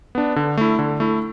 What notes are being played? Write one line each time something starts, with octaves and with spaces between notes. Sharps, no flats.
B3 D4
D3
A3 E4
D3
A3 E4